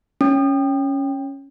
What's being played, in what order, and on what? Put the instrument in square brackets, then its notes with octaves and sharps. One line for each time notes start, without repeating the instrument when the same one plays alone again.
[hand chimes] C#4